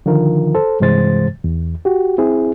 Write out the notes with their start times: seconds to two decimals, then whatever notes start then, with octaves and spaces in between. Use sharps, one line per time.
0.06 D3 D#3 F3 F4 A#4
0.55 A4 C5
0.80 G2 C3 E3 G#3 C5 A6
1.44 E2
1.85 F#4 G4
2.18 C4 E4 G#4